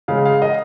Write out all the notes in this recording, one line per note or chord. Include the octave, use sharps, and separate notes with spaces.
C#3 G#3 F5
F5
D#5